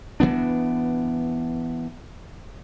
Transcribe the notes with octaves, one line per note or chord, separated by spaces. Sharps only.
E3 F3 B3 D4